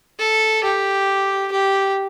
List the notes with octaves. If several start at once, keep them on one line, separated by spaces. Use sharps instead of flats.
A4
G4
G4